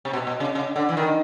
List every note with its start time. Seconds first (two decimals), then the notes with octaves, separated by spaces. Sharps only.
0.05 C3
0.13 B2
0.27 B2
0.40 C#3
0.55 C#3
0.76 D3
0.89 E3
0.97 D#3